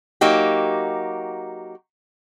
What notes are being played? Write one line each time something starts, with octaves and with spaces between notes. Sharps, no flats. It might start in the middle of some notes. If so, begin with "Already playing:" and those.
F#3 A#3 D#4 F#4 G4